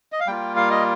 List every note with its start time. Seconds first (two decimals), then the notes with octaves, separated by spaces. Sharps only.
0.12 D#5
0.20 F5
0.27 G3 A#3 F4 G5
0.56 F5
0.71 D#5